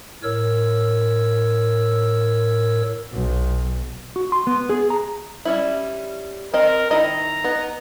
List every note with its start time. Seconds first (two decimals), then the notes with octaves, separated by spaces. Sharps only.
0.23 A2 A#4 C#5 E6
3.12 B1
4.16 F#4
4.32 C6
4.47 B3
4.70 G#4
4.90 A#5
5.45 G3 C#4 E4
6.54 C4 A#4 D#5
6.91 D#3 E4 D#5 A#5
7.44 B3 D#4